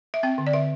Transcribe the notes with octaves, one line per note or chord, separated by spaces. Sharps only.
E5
C4 G5
D3
D5
D3 E5